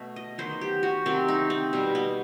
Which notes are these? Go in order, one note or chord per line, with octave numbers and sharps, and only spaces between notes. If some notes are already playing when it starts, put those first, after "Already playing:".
Already playing: B2 A3
D#5
D#3 F#3 B3 C5
G4
F#4
C3 D#3 F#3 C4
D#4
C4
B2 G3 B3
B3